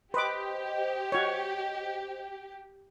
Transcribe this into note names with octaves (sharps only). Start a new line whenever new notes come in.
G4 B4 C5 D#5 D6
F#4 C#5